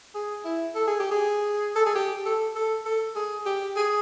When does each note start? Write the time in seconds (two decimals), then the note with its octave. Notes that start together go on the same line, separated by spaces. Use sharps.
0.15 G#4
0.45 E4
0.75 A4
0.88 G#4
1.00 G4
1.11 G#4
1.76 A4
1.86 G#4
1.96 G4
2.26 A4
2.56 A4
2.86 A4
3.16 G#4
3.46 G4
3.77 G#4